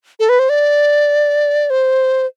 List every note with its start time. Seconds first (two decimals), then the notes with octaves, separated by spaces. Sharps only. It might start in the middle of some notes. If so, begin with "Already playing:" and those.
0.20 A4
0.29 B4
0.39 C5
0.49 D5
1.70 C5